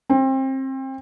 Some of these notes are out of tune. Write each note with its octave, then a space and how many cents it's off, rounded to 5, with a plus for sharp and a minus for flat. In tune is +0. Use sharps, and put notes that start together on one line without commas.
C4 +30